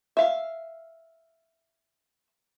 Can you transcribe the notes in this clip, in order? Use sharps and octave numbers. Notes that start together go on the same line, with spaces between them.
E5 F5